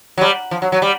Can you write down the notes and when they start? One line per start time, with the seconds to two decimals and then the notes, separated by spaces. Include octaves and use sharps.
0.17 F#3
0.21 G3
0.51 F3
0.62 F#3
0.72 F#3
0.82 G3